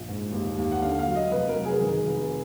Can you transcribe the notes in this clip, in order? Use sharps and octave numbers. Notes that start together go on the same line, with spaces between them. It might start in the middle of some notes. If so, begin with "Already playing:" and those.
Already playing: A#1
G#2
D#2
D#2
F#5
D3 F5
F5
F#3
D#5
F1 B4
A#4
F#3
G#4
D#3
F1